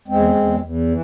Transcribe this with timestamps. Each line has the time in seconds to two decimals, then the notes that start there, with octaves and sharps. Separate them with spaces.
0.08 E2 G#3 C4
0.35 E2
0.61 E2
0.88 E3